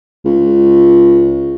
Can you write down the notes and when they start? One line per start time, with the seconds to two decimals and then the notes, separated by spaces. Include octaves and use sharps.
0.25 C#2